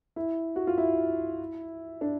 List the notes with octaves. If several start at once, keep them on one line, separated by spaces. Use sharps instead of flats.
E4
F#4
F4
E4
D4